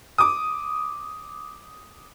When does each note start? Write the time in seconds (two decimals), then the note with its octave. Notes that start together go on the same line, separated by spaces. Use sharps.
0.18 D6 D#6